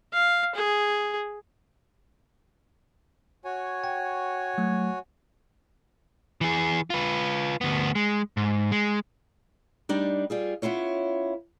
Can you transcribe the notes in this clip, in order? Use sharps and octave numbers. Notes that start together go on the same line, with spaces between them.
F5
G#4
F#4 C#5 G#5
G5
F#3 A3
E3 G#4
F4 B4
D2 B3
G#3
G#2
G#3
G3 D4 D#4
G3 F4 G#4
B3 C#4 E4 F4 C#5